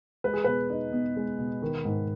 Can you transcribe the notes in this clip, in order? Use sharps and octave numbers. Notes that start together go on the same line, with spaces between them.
G#3 B4
G#4
B2 B4
D#4
B3
G#3
B2
D#3
G#2